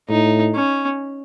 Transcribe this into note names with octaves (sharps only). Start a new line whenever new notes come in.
A2 D#4
C#4